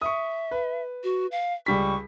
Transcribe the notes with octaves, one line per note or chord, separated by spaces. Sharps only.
E5 C#6 D#6
B4
F#4
F5
C#2 G3 C#6 B6